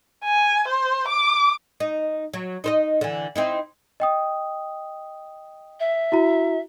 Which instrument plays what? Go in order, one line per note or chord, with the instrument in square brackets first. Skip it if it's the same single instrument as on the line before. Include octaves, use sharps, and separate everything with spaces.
[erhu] G#5
C5
D6
[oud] D#4
F#3
D#4 C5 D#5
D3 E3
C4 D#4 E4
[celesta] D#5 G5 D#6
[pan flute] E5
[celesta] E4 F#4 A#5